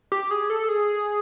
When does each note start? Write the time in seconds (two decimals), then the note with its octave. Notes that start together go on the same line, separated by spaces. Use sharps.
0.12 G4
0.31 G#4
0.50 A4
0.69 G#4